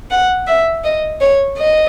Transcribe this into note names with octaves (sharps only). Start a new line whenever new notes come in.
F#5
E5
D#5
C#5
D#5